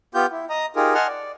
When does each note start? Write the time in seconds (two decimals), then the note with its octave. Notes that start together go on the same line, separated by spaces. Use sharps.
0.15 B3 F4 G4 G6
0.32 E4
0.50 D#5 A#5 D#6
0.76 D#4 F4 G4 G#4 A#4
0.94 D#5 F#5 G#5 A5 C6 F6
1.07 D5